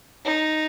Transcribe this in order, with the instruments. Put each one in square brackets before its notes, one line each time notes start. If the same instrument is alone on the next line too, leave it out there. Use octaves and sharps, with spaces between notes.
[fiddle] D#4